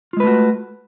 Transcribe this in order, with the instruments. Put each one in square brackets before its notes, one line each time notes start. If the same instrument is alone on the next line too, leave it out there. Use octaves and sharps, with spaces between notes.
[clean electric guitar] F4
G#3
B4
A3
F#4